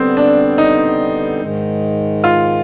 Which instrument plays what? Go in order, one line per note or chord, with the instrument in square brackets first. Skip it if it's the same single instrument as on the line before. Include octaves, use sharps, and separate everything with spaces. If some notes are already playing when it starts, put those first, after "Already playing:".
Already playing: [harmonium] D3 G3 B3 [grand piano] C4
[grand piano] D4
D#4
[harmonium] G#2 D#3 G#3
[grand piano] F4